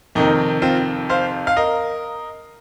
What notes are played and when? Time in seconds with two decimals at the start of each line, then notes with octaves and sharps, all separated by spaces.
0.15 F2 C3 D#3 A#3 D#4
0.62 C4 F4
1.10 C5 F5
1.47 F5
1.57 A#4 D#5